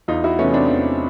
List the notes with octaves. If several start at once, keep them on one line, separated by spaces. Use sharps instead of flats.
E2 D#4 F4
E4 F#4
C3 E3 A3 B3 C#4
C4 D4
E2